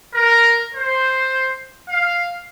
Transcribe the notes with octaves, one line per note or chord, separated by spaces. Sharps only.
A#4
C5
F5